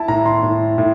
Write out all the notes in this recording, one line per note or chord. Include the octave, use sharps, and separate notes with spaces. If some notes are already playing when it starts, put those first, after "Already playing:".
Already playing: E4 A5
A2 A#5
C6
A2
A2